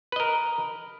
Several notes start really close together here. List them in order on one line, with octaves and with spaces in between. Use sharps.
B4 D#5 A#4